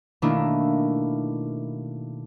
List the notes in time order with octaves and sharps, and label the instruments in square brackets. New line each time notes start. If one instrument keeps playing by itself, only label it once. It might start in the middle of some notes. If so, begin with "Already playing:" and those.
[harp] B2 D#3 A3 A#3 D4 E4